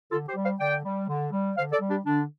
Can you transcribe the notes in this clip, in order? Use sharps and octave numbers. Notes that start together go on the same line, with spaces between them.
D3 F4 A4
G4 C5
G3
C5 F5
D3 D5 G5
G3
D3
G3
D3 C5 F5
A4 D5
G3
D4 G4
D3 D4